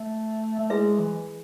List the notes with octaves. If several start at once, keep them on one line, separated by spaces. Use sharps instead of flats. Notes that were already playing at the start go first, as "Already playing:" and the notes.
Already playing: A3
A3
G#3 E4 G#4 B4 E5
E3